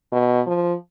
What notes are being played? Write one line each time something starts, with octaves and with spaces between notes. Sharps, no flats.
B2
F3